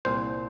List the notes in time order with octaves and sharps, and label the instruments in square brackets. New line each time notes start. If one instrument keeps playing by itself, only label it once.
[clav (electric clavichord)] C2 A#2 C5